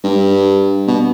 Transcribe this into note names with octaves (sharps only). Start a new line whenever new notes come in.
G2
B2